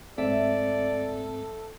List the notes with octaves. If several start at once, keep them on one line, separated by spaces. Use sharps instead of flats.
G#2 A3 C4 A4 D5 E5